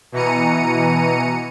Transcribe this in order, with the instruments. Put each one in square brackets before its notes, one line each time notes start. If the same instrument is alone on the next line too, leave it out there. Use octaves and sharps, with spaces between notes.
[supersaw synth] B2 E3 A#5 C#7 D#7